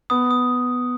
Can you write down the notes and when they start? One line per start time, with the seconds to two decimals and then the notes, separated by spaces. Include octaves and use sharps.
0.10 B3 D#6
0.31 D#6